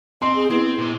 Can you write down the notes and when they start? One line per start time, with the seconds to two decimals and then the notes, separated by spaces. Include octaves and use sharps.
0.22 C4 D#5 C6
0.35 G#4
0.51 B3 C4 E4
0.78 A#2 C5